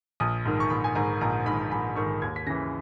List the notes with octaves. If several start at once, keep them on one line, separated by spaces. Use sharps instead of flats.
A#1 D#6
G#2 D#3
C#6
A#1 B5
G#5
G#2 D#3 A#5
A#1 A#5
G#2 D#3 B5
A#1 B5
G#2 D#3 C#6
D#2 G#6
B6
C#3 E3 A#6